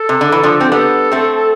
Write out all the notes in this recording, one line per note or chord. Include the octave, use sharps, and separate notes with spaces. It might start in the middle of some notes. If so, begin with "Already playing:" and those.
Already playing: A4
C3
D3
E3
D3 F3
C4
G3 B3 A4
A3 C4